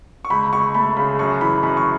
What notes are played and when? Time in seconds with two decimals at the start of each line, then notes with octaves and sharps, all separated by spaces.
0.25 C#6
0.30 C#2 B5
0.53 C#2 C#6
0.75 A3 B5
0.97 C#3 B5
1.19 F#2 C#6
1.41 E3 B5
1.63 F#2 B5
1.77 C#6